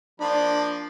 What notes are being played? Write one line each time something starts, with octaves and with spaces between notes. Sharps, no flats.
F3 A#3 D4 B5